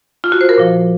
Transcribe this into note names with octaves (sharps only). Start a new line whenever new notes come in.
F4
F#4
C5
A#4
A#2 F3